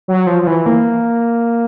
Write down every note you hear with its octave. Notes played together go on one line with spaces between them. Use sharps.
F#3
F3
F3
E3
A#3